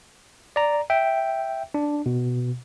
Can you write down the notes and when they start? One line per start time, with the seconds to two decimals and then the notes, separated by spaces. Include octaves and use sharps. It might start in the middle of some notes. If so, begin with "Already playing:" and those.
0.56 D5 A#5
0.90 E5 G5
1.74 D4
2.06 B2